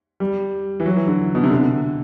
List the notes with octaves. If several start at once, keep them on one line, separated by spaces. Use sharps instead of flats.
G3
E3
F#3
E3
D3
B2
C3
D3